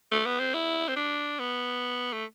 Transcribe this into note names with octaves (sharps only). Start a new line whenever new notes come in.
A3
B3
C4
E4
C4
D4
B3
A3